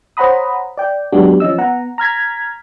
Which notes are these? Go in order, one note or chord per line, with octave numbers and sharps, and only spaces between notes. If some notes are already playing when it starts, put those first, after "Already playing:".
C5 C#5 F#5 A#5 B5 D#6
D5 G5
F#3 G#3 B3 D4 F#4 G4
F3 C#4 D#5 E6
B3 F#5 A#5
A#5 F6 G#6 B6